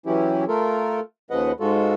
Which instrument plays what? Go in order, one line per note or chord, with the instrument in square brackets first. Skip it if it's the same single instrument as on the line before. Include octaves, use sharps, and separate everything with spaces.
[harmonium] E3 F#3 C#4 E4 G4
A3 F4 A4 A#4
D#2 C#3 F3 B4 D#5 F#5
G#2 G#3 F4 F#4 A4